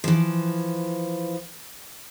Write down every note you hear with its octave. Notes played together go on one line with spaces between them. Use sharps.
E3 F3